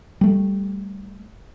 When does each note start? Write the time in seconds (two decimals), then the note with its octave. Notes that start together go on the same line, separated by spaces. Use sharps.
0.21 G3 A3